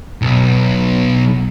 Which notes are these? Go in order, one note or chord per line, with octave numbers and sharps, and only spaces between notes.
B1